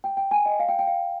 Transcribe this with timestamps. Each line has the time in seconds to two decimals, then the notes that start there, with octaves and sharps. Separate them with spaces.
0.04 G5
0.17 G5
0.31 G#5
0.46 D#5
0.59 F5
0.69 G5
0.79 G5
0.87 F5